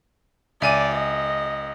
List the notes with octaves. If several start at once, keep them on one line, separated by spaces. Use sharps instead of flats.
C#2 D5 E5 G#5 D#7
D#5